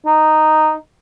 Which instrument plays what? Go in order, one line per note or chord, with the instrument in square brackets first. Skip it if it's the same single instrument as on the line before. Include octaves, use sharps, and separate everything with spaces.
[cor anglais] D#4